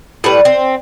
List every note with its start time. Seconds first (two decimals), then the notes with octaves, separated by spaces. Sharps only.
0.24 A2 G3 B4
0.45 C4